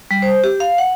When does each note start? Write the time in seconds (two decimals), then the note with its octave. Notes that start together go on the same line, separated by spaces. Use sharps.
0.11 G3
0.22 C5
0.44 G4
0.60 F5
0.78 F#5